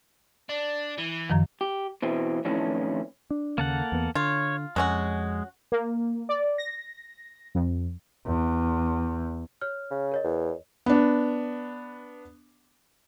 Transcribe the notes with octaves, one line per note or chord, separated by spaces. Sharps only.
D4
E3
F#2 D#3 F3
G4
B2 E3 C4
F2 A2 D#3 E3 C#4 D4
D4
D#2 C#3 A#3 A4 F#5
E2 B3
D3 F4 C#5
F2 F#3 G#3 C#4 F#4
A#3
D5
A#6
F2
E2
C#5 F6
C#3
A#4 C#5 D#5
E2
B3 D4